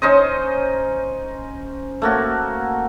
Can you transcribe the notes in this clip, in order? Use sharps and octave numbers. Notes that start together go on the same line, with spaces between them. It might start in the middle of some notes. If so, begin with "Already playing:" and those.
C#4 D#4 C5 D#5
A3 A#3 F#4